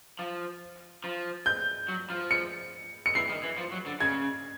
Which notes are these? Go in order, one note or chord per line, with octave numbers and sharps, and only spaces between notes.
F3
F3
G6
F#3
F3
C#7
C#7
E3 C7
D#3
E3
F3
F#3
D3
C#3 G#6